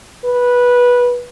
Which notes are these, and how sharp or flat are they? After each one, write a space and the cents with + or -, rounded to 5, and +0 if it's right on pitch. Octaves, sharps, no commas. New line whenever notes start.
B4 -15